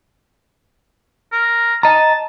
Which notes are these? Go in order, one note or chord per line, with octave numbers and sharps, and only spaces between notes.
A#4
D#5 A5 A#5